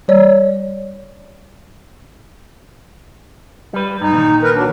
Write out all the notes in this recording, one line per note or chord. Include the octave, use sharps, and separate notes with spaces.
G3 C#5 D5
G3 B4
G2 D#4
A#2 D#3
A#4 B4
F#3 D4